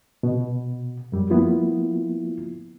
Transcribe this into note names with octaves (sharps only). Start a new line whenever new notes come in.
B2
F#2 G3
F3 A#3 B3 E4 F4